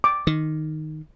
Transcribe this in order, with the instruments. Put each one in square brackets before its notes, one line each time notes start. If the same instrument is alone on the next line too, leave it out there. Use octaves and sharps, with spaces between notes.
[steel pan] D6
[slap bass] D#3